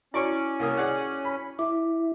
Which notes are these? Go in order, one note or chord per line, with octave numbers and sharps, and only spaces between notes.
C#4 E4 F#4 D5 C#6 D7
C2 A#3 D#6
G#4 D5 F#5
B5
E4 D6